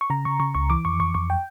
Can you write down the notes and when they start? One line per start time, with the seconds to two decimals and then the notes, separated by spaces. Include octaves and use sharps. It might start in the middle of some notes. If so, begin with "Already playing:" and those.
0.01 C#6
0.10 C#3 A#5
0.25 C#3 C#6
0.40 C#3 C#6
0.55 C#2 C#6
0.70 E3 D6
0.85 F2 C#6
1.00 F2 C#6
1.14 F2 C#6
1.30 G5